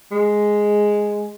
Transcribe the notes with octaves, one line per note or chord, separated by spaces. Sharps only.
G#3